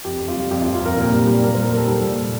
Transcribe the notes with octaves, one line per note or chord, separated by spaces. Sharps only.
F2 G4
F2
F4
G3
F2 G4
F4
F2
F4
F2 A#4
A#2
G3
G3
G3 A#4
A#2 C5
A#4
G3 A4
G3 A4
A#2
A#2